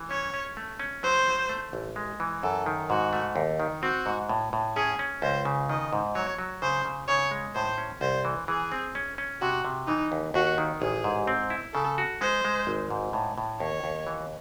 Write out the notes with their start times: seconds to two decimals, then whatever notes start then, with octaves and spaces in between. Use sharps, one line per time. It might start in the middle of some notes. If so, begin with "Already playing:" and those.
Already playing: E3
0.10 C#4 C#5
0.34 C#4
0.57 A3
0.80 C#4
1.03 F#3 C5
1.27 F#3
1.49 A3
1.73 A1
1.96 G#3
2.20 E3
2.42 F#2 A4
2.66 D#3
2.90 G#2 F#4
3.13 A3
3.36 D#2
3.60 D#3
3.82 C4 F#4
4.06 G#2
4.29 A2
4.53 A2
4.76 C#4 G#4
4.99 C#4
5.22 C#2 C5
5.45 C#3
5.69 D#3 D#5
5.93 G#2
6.15 F#3 C#5
6.39 F#3
6.62 C#3 C5
6.85 C#3
7.08 C#3 C#5
7.31 G#3
7.55 A2 C5
7.78 C#4
8.01 C2 C5
8.25 E3
8.48 E3 G#4
8.72 C4
8.95 C#4
9.18 C#4
9.41 C3 F#4
9.65 C3
9.87 E3 D#4
10.12 D#2
10.34 D#2 F#4
10.58 D#3
10.81 A1 G#4
11.04 G#2
11.27 C4
11.50 E4
11.74 C#3 A4
11.98 F#4
12.21 G#3 C5
12.45 G#3
12.67 G#1
12.90 G#2
13.13 A2
13.38 A2
13.60 D#2 C#5
13.84 D#2
14.07 E3